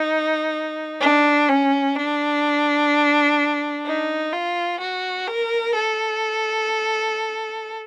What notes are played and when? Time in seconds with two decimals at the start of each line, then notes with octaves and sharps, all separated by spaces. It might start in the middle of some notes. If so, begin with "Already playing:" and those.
Already playing: D#4
1.01 D4
1.49 C#4
1.96 D4
3.86 D#4
4.33 F4
4.81 F#4
5.27 A#4
5.75 A4